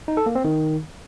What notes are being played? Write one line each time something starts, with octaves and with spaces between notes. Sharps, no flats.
D#4
A4
A#3
C4
D#3